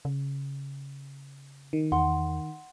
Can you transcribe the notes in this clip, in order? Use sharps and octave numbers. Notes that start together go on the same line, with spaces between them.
C#3
D#3
E2 F#5 C6